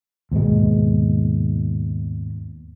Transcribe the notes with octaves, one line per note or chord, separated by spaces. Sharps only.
D#2 G#2 B2 G#3